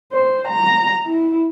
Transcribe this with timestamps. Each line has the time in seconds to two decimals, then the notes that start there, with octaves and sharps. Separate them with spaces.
0.13 C5
0.48 A#5
1.06 E4